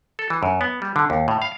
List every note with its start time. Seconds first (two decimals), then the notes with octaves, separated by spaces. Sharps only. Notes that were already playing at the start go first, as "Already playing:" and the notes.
0.19 A4
0.30 E3
0.43 F#2
0.61 B3
0.82 G3
0.96 D3
1.10 D#2
1.28 A2
1.42 F5